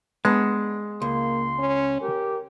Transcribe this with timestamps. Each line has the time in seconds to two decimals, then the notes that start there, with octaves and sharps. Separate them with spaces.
0.25 G#3 B3 D4
1.02 C#2 A#3 C6
1.59 C#4
2.01 G4 A#4